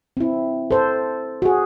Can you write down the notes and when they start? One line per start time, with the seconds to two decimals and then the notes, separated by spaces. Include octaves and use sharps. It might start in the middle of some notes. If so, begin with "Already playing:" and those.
0.17 C4 E4
0.71 A4 C5
1.42 F#4 G#4